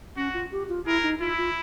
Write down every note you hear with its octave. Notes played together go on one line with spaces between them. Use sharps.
C#4 F#4
F4
G4
F4
E4 G#4 A#4
D#4
E4 F4
F4